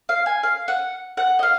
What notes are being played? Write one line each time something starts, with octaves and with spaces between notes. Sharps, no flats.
F5
G#5
F5
F#5
F#5
D#5
F5